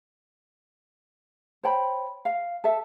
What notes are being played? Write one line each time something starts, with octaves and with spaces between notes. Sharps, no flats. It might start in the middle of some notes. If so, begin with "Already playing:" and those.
C5 C#5 G5 B5
F5
A4 E5